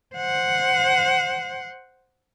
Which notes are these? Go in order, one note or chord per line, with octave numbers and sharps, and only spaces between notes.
C5 F#5